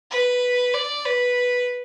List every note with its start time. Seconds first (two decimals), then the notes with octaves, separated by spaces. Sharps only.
0.11 B4
0.74 D5
1.05 B4